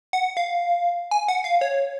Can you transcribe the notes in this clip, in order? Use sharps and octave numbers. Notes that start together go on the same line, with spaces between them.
F#5
F5
G#5
F#5
F5
C#5